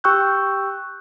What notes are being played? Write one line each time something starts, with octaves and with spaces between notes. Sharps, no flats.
G4 G5 C#6 E6 F#6 G6